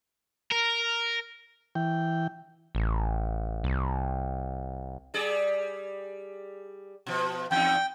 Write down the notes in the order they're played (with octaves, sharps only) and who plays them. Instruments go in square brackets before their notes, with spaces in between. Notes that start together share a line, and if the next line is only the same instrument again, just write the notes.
[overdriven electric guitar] A#4
[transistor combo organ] E3 G5
[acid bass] A1
C2
[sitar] G3 G#4 D5
B2 F3
[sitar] E2 D#4 [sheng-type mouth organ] G5